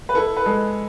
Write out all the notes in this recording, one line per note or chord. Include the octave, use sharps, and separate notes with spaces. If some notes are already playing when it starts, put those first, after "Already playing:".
B4
E4 A4
B4
G#3 A4